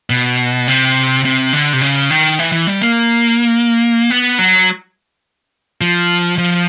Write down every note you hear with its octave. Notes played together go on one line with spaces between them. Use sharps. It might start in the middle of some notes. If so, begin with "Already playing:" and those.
B2
C3
C3
D3
C3
C#3
D#3
E3
E3
G3
A#3
B3
F#3
F3
F3